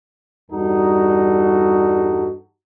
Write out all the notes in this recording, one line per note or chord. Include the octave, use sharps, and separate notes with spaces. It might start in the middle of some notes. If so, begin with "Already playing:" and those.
E2 G2 G3 D#4 F#4 A4